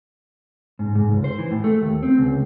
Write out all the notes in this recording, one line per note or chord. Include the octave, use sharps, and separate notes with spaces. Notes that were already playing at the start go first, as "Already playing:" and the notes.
G#2
G#2
C#2
C5
E3
A2
A3
D#2
C4
C#2